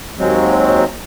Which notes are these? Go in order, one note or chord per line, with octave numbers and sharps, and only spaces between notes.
D#2 F#3 G#3 C4